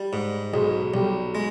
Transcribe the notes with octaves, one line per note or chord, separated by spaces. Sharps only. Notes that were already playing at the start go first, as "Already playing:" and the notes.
Already playing: G3
G#2
B1 G#3 G#4
B1 G3 G4
G#3